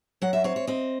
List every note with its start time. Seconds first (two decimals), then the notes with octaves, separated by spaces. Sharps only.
0.22 F#3 F#5
0.33 E5
0.44 C4 C#5
0.56 C#5
0.67 C4 D#5